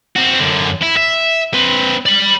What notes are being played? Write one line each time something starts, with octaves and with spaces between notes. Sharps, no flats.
C4 F#4
F#2 D3
E4
E5
C4 B4
D5 B5